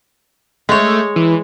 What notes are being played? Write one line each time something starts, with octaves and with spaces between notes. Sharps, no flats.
G#3 A3 C#5
E3